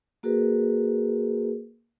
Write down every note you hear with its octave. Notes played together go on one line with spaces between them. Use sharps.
A#3 F#4 G#4 A#4 B4